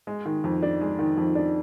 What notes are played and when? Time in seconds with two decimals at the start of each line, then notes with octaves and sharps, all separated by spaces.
0.07 G#3
0.26 D#3
0.44 F2
0.63 D4
0.81 G#3
0.99 D#3
1.17 F2
1.35 D4